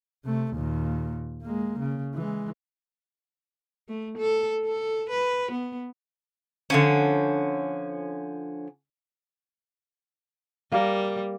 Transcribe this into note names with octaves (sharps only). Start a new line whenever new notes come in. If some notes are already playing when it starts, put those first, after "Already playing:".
C3 A3
D#2 A#2
G#3 A#3
C#3
E3 G#3
A3
A4
A4
B4
B3
D3 F3 C#4
G3 A#3 A#4